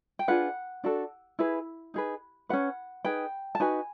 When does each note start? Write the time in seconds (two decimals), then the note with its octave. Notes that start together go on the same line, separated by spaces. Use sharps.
0.19 G5
0.28 D4 F4 G#4 B4 F#5
0.84 D4 F#4 A4
1.39 E4 G#4 B4
1.94 D#4 G#4 B4
2.49 C#4 F#4 B4 F#5
3.05 D#4 G#4 B4 G5
3.55 A5
3.60 D#4 F#4 B4 G#5